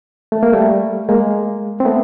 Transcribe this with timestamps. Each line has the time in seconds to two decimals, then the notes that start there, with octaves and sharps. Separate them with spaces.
0.32 A3
0.43 A#3
0.52 G3 A3
1.09 G#3 A#3
1.80 C4
1.85 A3 B3